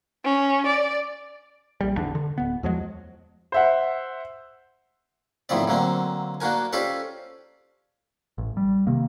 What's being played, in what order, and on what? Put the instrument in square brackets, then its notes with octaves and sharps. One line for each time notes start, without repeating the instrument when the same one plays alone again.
[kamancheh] C#4
D5
[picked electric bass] A#1 G3
G#1 E2 D3 D4
D3
D1 B3
E2 F3 F#3 G#3
[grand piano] C5 E5 F#5
[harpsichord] E2 A2 D#3 F3 C4 D5
D3 F#3 A#3 C4
A#3 D4 F#4 A#4 G#5
C#4 F4 G4 A4 C5 D5
[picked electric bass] A1
G3
C3 D#3 A#3